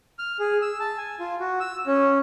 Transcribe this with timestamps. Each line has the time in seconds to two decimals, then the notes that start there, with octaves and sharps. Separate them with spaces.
0.19 F6
0.39 G#4
0.62 E6
0.80 A5
0.98 G#5
1.20 F4
1.40 F#4
1.60 E6
1.87 C#4